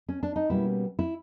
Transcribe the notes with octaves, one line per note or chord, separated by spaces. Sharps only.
C#4
D4
D#4
B2 G3 A#3 C#4 E4
E4